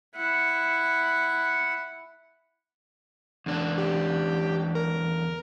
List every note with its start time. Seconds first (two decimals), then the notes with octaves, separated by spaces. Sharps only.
0.15 E4 F#5
3.46 E2 D3 D4
3.78 G4
4.75 A#4